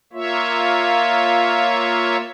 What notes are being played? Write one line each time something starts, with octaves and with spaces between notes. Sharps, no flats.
A#3 F4 C#5 E5